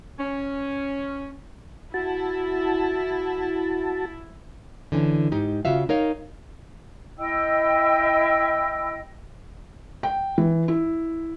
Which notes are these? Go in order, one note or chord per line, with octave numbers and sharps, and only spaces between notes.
C#4
E4 F#4 A5
D3 E3 C#4
G#2 D#4 G4
C#3 F4 F#4 E5 F5
D#4 A#4 C#5 F5
E4 D#5 G5 E6
G5
E3
E4